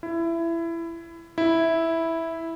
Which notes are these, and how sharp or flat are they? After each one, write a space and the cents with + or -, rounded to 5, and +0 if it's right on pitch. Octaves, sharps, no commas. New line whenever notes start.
E4 +20
E4 -5